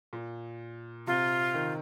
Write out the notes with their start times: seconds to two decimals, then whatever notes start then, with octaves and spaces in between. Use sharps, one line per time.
0.13 A#2
1.07 C3 F4
1.54 D#3